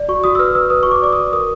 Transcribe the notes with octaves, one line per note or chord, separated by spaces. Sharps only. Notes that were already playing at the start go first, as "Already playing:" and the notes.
Already playing: D5
F#4 C#6
F#4 D#6
E6
B4 F6
B4 E6
B4 D#6
F#4 C#6
D6
D5 D6
F#4 D#6
A#4 D#6